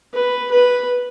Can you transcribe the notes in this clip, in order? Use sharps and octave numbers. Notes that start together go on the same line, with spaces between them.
B4
B4